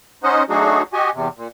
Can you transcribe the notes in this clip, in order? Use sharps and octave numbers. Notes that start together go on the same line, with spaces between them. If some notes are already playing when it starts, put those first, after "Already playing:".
C#4 D#4 C5 D#5 F#5
F#3 A3 D4 D#4 F#4 G#4
F#4 G4 D#5 G#5
E2 C3
A#2